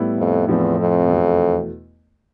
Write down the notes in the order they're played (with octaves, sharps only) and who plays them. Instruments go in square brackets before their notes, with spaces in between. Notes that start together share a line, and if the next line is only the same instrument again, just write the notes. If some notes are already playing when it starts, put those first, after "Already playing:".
Already playing: [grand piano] A2 G3 B3 E4
[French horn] F2
[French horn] E2 [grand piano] A2 F3 C4
[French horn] F2
[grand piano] E2 B2 A3